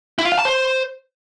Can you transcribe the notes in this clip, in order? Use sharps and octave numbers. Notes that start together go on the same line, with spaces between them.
E4
F4
F5
A5
C5